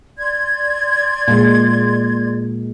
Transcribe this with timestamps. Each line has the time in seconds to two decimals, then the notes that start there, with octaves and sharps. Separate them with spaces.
0.17 D5 C6 G#6
1.28 A#2 G#3